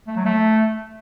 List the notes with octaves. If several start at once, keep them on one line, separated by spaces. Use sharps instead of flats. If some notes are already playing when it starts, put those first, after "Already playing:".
A3
F#3
A3